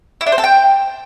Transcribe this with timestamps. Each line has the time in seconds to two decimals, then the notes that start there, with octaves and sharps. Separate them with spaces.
0.21 E4
0.27 D4
0.32 C5
0.38 A4
0.44 G5